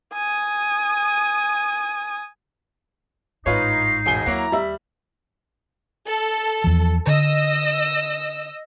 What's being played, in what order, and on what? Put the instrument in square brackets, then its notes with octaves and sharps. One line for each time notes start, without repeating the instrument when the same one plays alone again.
[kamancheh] G#5 D#6
[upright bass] A1 G#2 [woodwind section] D#4 [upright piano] F4 B4 C#5 [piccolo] C7
[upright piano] E1 G#5 G7
[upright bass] D#2 [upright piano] F#3 A#3 F#4 [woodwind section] E4 A#5
[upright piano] G3 E5
[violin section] A4
[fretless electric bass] E2 F3
[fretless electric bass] D3 [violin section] D#5 E6